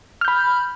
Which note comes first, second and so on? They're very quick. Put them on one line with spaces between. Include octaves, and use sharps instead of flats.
F6 G6 B5